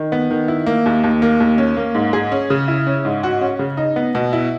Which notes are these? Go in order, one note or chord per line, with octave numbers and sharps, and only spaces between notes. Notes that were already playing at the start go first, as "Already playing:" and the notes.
Already playing: D#3
B3
D#3
E4
A#3
D#2
D#2
A#3
D#2
C#4
A#3
G#2
G#4
C#4
C#3
E4
C#4
G#2
F#4
C#4
C#3
D#4
B3
B2
E4